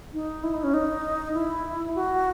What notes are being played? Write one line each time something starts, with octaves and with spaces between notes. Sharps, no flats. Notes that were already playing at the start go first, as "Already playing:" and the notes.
D#4
E4
D#4
C#4
D#4
E4
F#4